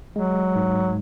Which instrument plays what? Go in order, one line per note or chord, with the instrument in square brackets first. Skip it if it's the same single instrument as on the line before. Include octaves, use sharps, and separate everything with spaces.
[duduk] F#3 [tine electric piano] G#3
[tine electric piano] G#2